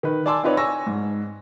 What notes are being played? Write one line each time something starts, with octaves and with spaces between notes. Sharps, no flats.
D#3 B4
D5 G#5 A5 C6 D6 E6
C4 D#4 F4 B4 C#5 D5
G#5 C#6 E6 A#6
G#2